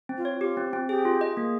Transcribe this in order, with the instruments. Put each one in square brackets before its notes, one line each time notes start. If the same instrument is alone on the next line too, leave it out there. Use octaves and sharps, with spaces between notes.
[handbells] C4
[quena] F4
[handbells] C#5
[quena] F4 [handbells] G4
[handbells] C4
C4
[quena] G4 [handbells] G#4
[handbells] F4
D#5
[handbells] A#3 [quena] G#4